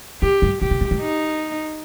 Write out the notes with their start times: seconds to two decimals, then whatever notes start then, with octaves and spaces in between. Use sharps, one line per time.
0.22 D3 G4
0.42 G2
0.61 A#2 G4
0.71 C3
0.81 A#2
0.91 G#2
1.01 D#4